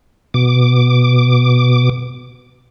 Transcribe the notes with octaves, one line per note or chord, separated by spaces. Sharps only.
B2 D6